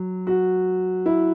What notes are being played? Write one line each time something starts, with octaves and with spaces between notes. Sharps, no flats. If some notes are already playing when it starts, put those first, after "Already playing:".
Already playing: F#3
F#4
E4